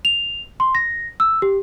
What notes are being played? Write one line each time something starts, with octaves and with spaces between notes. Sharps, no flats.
F7
C6
A#6
E6
G4